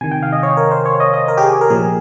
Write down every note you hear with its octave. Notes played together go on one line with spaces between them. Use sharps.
C3 D#3 G#5
G5
F5
D#5
C#5
A#4
C5
C#5
D#5
D#5
A#4
G4
G#4
A#4
A#2 F3 G#4